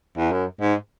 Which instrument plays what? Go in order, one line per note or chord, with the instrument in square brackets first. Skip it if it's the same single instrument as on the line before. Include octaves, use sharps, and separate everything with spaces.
[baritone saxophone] E2
F#2
G#2